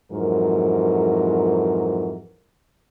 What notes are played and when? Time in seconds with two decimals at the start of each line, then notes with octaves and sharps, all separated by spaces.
0.12 F2 G#2 E3 F#3 A#4